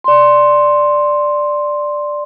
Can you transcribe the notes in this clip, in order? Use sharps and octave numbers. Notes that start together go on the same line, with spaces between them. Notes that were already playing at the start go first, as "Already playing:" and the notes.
D5 C6